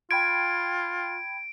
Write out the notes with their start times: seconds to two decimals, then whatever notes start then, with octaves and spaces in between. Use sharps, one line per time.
0.11 F4 G5 B5 G#6 D7